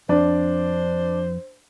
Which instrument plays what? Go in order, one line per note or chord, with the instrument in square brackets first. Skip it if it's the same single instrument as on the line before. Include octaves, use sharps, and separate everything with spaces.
[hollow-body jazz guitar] F2 [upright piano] D4 [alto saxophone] C5